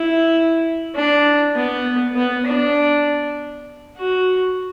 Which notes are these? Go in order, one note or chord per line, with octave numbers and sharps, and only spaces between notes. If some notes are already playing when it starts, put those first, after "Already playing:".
Already playing: E4
D4
B3
B3
D4
F#4